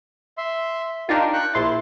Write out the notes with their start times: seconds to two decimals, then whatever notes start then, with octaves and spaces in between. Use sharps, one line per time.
0.37 E5 C6
1.09 D4 D#4 F4 G4 A#4
1.33 G5 C#6 F#6
1.54 A#1 E4 C6 A6